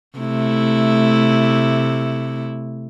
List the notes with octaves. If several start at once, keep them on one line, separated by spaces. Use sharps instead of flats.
C3 A3 E4